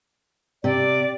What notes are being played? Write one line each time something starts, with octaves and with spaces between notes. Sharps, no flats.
C3 D5